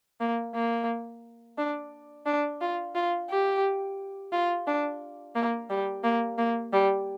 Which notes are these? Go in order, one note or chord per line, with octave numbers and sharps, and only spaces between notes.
A#3
A#3
D4
D4
F4
F4
G4
F4
D4
A#3
G3
A#3
A#3
G3